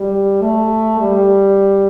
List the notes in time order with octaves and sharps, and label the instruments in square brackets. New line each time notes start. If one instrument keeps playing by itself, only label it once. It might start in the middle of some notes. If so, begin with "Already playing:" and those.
Already playing: [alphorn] G3
A3
G3